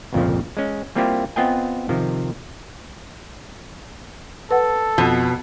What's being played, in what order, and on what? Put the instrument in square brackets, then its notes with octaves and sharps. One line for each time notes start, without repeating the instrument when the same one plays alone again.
[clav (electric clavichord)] G1 C2 F2 A#2 C#3 F3
G#3 C#4
G3 A#3 C4 E4 F4 G4
B3 C4 F4 D#5 G5 G#5
C3 D#3 F3
[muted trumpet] A4 [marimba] B4 F#5
[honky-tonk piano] F2 B3 [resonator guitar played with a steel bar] B2